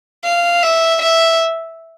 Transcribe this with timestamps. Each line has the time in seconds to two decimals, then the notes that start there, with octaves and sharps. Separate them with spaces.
0.24 F5
0.63 E5
1.02 E5